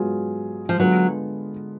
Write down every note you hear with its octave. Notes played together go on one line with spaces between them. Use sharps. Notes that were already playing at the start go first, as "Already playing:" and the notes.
Already playing: G#2 F#3 B3 F4 G#4
F3
D3 F#3 G#3 B3 F4